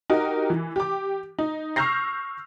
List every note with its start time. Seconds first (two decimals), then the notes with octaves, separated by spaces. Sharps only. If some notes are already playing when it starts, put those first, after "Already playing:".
0.10 D#4 F#4 G4 A#4 D#5
0.50 E3
0.76 G4 D6
1.39 D#4
1.76 C#6 E6 F6 G6 A#6 C7